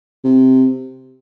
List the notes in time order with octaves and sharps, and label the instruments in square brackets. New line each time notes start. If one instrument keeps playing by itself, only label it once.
[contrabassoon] C3